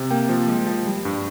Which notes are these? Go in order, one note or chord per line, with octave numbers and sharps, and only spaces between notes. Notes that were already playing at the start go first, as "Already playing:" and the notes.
Already playing: C3
A#3 G5
F3
G#3
F3
G3
G2